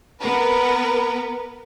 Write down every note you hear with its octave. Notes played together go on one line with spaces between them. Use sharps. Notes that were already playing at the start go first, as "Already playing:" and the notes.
B3 A#4 B4